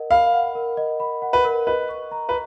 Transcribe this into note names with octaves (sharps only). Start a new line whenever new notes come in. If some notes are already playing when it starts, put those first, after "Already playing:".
Already playing: A#4 D#5 F#5
F5 B5
F#5
A#4
D#5
B5
F#5
B4
A#4
B4 D#5
C#6
A#5
B4